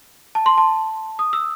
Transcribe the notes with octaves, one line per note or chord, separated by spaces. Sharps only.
A5
C6
A5
D#6
E6